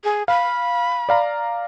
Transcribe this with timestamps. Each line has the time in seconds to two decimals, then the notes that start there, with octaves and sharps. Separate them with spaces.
0.04 G#4
0.28 F5 B5
1.09 D5 F5 A#5